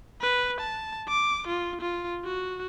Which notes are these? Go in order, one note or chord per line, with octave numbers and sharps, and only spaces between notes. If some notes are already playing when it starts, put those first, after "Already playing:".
B4
A5
D6
F4
F4
F#4